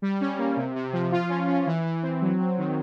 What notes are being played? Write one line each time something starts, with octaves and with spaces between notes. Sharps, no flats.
G3
C#4
A#3
C3
C3
F3
F4
C#4
C#4
E3
E3
C4
F#3
F#3
D#3